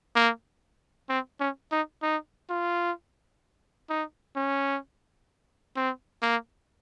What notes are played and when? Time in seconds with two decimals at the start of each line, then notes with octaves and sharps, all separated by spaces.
0.16 A#3
1.09 C4
1.40 C#4
1.72 D#4
2.02 D#4
2.49 F4
3.89 D#4
4.36 C#4
5.76 C4
6.22 A#3